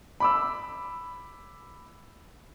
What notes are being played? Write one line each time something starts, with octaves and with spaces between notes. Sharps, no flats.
B5 D6 E6